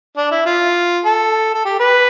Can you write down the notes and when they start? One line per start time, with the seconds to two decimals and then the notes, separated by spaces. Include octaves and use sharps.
0.17 D4
0.31 E4
0.46 F4
1.05 A4
1.54 A4
1.65 G4
1.80 B4